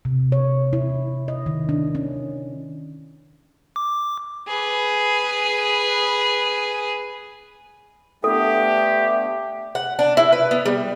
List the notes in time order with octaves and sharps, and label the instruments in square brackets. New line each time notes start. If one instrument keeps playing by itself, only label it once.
[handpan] C3
C#5
E4
D#5
D#3
D4
C#4
[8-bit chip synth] D6
[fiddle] G#4 B4
[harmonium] A3 B3 D4 [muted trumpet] G4 [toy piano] A4 [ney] E5
[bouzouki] F#5
D4
E4
B4
B3
G3